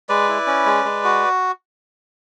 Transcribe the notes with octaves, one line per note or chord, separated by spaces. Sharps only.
G#3 B4 D5
E4
C#4
G#3
G#3
F#4